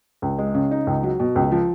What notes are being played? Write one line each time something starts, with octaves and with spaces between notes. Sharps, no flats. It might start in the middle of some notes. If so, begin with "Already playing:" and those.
C#2
G#3
C#3
D#4
C#2
F#3
B2
C#2
F3